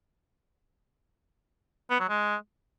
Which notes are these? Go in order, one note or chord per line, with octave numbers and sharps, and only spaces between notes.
B3
F#3
G#3